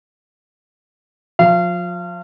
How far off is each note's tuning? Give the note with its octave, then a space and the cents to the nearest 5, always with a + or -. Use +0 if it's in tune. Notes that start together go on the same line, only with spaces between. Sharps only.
F3 +35 F5 -30